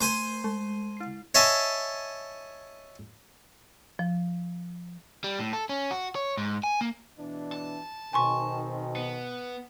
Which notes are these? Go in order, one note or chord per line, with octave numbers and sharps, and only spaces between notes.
A3 C5 G#5 C6
G#3
E4 C7
C#5 D#5 E5 G#5 A5
F3
G3
A2
A4
C#4
F#4
C#5
G#2
G#5
A#3
B2 E3 D4
A5
B1 B2 D#3 C4 G#5 C6 C#6
B3